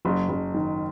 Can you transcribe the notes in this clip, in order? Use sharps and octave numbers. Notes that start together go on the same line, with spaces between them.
F#1
F#1
D#3